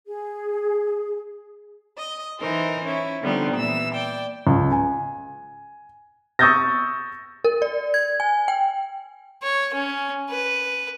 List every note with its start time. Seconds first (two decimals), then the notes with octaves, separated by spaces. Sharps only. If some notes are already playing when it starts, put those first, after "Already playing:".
0.07 G#4
1.97 D#5
2.38 E3 D#4 A#4 C5
2.85 C#4 E4
3.21 D3 F3 G3 B3 C4 D#4
3.54 A#2 E3 E6
3.93 D5 G5
4.47 C#2
4.72 G#5
6.39 C#6 D#6 E6 G6 A6 A#6
7.45 A#4
7.62 D5
7.94 G#6
8.20 G#5
8.48 G5
9.43 C#5
9.74 C#4
10.30 B4